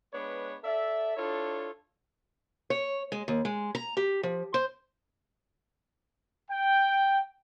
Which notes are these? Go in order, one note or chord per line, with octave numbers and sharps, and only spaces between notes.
G#3 B3 D4 B4 C#5
A4 D5 E5
D4 E4 F4 A4 C#5
C#5
G#3
D#2
G#3
A#5
G4
F3
C5
G5